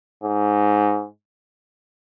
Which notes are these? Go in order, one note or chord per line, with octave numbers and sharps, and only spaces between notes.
G#2